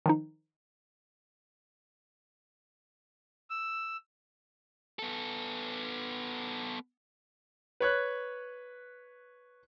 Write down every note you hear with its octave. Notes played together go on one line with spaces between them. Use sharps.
D#3 F3 D#4
E6
B3 A4
B4 C#5 F#6